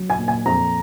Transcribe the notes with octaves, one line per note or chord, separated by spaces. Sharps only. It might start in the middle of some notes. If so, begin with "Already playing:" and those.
Already playing: F#3
G#5
A#2
G#5
F2 A#5